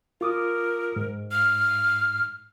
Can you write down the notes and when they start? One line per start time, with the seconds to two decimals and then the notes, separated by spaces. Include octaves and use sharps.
0.21 F4 A#4 D6 D#6
0.96 G#2
1.31 F6